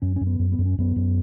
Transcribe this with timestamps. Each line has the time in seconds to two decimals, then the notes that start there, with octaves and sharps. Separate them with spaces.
0.02 F#2 C#4
0.16 F#2 C#4
0.27 B3
0.39 F#2
0.52 B3
0.59 F#2
0.66 C#4
0.78 F#2 B3
0.96 F#2